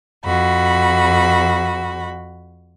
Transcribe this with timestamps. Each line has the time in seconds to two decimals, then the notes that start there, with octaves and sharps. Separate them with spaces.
0.24 F2 F#4 B5